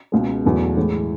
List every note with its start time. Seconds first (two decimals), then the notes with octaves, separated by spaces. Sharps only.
0.12 C#2 B2 G#3
0.44 E2 B2 F#3 A3
0.77 A2 E3 G#3